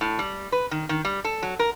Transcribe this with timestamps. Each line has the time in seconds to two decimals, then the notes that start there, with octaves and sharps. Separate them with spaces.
0.01 A2
0.19 G3
0.52 B4
0.71 D#3
0.89 D#3
1.05 G3
1.24 A4
1.43 F#3
1.59 A#4